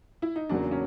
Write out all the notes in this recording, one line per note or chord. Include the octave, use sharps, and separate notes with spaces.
E4
D#4
E2 C#3 F#3 A#3 D4
C#4